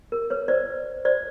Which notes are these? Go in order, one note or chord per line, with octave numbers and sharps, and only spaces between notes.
A#4
B4 C#5
C5 D5
C5 D5